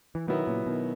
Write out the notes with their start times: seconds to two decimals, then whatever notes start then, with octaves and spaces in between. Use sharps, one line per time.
0.15 E3
0.28 B2 D#3 F#3 B3 E4
0.47 A#2 C#3
0.66 B2 D#3